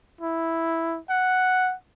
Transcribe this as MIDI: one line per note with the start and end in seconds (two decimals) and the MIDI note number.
0.21 0.98 64
1.10 1.74 78